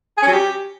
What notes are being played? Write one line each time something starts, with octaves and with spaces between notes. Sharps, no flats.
G#4
C#4
F#3
G4